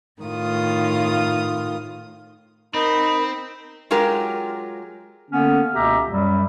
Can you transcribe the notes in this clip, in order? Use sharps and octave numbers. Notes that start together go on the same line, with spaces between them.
A2 D#3 F4 D#6
C4 D#4 A#4 B5
F#3 G#3 F4 G4 A#4
D3 A#3 B3 C#4
C#2 B2 A#3 G4 E5 A#5
F#2 F#3 G3